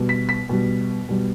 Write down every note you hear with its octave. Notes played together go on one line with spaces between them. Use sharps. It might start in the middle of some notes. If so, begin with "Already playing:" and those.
Already playing: B2 G3
B6
B6
B2 G3
B2 G3